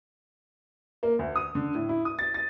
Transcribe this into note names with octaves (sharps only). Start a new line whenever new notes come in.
A#3
D2
D#6
D3
A2
E4
D#6
A6
A6